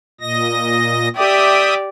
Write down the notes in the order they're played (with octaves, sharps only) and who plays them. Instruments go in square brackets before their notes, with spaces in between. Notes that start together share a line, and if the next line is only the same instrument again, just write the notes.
[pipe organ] A#2 D#5 A#6
[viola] G4 D5 [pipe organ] E5 G5 D#6